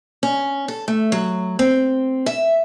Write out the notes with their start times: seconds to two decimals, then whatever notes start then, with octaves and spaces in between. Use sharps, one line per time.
0.23 C#4
0.68 A4
0.88 A3
1.12 F#3
1.59 C4
2.26 E5